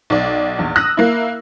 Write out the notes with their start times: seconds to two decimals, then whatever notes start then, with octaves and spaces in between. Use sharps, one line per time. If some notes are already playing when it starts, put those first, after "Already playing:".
0.10 B1 D5
0.59 A#1 E2
0.76 D#6 E6 F#6 A#6
0.97 A#3 E4